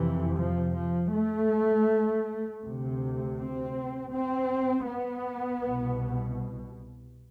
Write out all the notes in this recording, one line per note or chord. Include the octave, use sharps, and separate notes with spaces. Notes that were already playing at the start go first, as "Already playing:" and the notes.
Already playing: F2 C3 E3
F3
F3
A3
D2 C3
C4
C4
B3
C2 B2